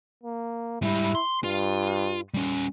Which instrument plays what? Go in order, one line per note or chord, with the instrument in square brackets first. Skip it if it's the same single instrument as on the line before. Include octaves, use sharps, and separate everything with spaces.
[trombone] A#3
[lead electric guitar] G#2 G3 [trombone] E4
[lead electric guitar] C6
[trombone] G2 [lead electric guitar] F4
[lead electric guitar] G3 C#4